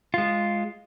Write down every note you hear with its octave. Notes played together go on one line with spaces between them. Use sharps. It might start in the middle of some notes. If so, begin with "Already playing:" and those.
G#3 F4